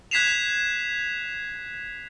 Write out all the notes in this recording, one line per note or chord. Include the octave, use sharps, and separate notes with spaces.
F#6 G#6 B6 C7 E7 F7